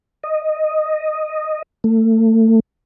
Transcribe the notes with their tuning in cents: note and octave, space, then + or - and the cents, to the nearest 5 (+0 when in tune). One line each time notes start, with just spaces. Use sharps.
D#5 -5
A3 +30